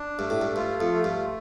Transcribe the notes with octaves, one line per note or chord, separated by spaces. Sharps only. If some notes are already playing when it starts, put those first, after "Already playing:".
Already playing: D4
G2 A3
A2
G2
G2 F4
F2
A3
G2